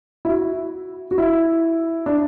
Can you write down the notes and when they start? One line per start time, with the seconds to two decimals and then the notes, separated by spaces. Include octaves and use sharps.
0.25 E4
0.29 F#4
1.11 F#4
1.18 E4
2.06 D4